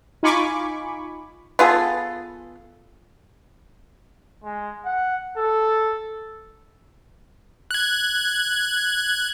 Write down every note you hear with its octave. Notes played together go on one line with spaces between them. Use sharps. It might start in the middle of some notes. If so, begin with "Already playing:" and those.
D#4 F4 G#5 B5 C#6 D6
B3 F4 G#4 A4
G#3
F#5
A4
F#6 G#6